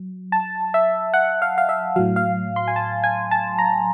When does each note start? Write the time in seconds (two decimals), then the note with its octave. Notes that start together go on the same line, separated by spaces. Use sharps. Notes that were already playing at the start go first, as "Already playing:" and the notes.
Already playing: F#3
0.32 A5
0.74 E5
1.14 F#5
1.42 F5
1.58 F5
1.69 E5
1.96 A2 F#3 F5
2.16 F5
2.56 C6
2.68 G#5
2.76 A5
3.04 G#5
3.31 A5
3.58 A#5